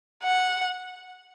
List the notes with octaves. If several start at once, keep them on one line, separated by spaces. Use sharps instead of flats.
F#5